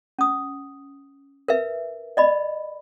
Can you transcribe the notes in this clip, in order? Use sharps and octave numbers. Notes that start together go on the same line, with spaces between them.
C#4 D#6
A#4 B4 E5
D5 D#5 B5